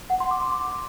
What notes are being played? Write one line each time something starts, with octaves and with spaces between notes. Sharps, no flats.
F#5
C6
D6
D6
C6